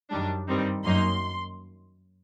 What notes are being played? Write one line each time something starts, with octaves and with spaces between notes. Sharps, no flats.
F#2 D#3 G3 D4
G2 D#3 G3 C4 D#4
F#2 F#3 A#3 D#4 C6